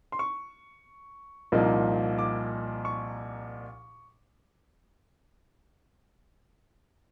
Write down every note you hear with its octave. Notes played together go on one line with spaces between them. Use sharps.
C6
C#6
C2 A#2 F3 A#3 D#4
D6
C#6